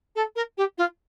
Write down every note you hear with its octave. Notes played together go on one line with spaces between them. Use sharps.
A4
A#4
G4
F4